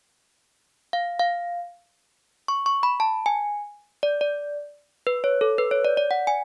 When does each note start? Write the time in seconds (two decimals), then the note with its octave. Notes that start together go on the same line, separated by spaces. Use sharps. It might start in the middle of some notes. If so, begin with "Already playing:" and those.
0.93 F5
1.19 F5
2.48 C#6
2.66 C#6
2.83 B5
3.00 A5
3.26 G#5
4.03 D5
4.21 D5
5.07 B4
5.24 C#5
5.41 A4
5.58 B4
5.71 C#5
5.85 D5
5.97 D5
6.11 F#5
6.27 G#5